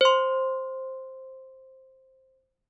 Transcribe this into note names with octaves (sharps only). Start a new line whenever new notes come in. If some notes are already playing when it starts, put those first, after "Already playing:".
C5 C6